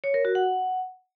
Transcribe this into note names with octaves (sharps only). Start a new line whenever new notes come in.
C#5
A#4
F#4
F#5